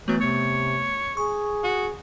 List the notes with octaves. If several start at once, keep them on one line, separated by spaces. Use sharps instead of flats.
E3 F#3 A3 B3
C3 C#5
G#4 C#6
F#4